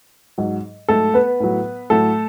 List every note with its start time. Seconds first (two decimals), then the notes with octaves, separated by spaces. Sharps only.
0.38 G#2 F#3
0.88 G#2 F#3 A3 A4
1.14 B3 B4
1.40 A2 F#3
1.90 A2 F#3 A3 A4